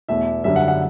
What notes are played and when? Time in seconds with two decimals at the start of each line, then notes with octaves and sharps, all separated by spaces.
0.09 E2 B2 A3 E5
0.44 F#2 D3 G3 D4 E5
0.56 F#5
0.68 F#5